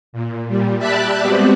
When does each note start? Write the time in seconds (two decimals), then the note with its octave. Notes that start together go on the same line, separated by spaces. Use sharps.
0.13 A#2
0.48 A#2 G3
0.78 G4 D5 E5 A5 B5 F#6
1.21 G3 G#3 B3 C4 F#4 G4